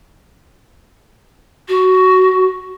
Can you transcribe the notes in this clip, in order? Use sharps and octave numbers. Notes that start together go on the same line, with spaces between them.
F#4